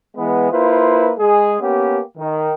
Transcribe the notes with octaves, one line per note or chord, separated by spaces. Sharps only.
E3 G#3 B3
A#3 E4 F4 B4 C5
G#3 G#4
A#3 B3 C#4 G4
D#3